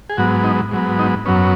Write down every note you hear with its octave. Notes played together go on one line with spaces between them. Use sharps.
G#4
G#2 F#3 B3 F#4
D#4
G#2 F#3 B3
D#4
F#2 F#3 B3 C#4